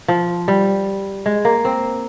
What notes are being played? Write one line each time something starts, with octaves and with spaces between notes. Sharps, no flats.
F3
G3
G#3
A#3
C4